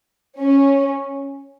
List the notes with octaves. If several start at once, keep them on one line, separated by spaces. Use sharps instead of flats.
C#4